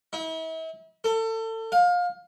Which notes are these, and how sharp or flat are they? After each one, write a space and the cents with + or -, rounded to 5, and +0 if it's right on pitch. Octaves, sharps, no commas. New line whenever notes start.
E4 -40
A4 +30
F5 +25